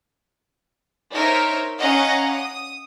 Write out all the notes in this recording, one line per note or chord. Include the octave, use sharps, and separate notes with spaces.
D#4 A#4 C5 C#5 E5
C#4 D#5 F5 F#5 A#5
D#6